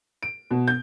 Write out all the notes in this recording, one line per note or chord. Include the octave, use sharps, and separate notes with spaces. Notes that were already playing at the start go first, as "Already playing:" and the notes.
D7
B2
G6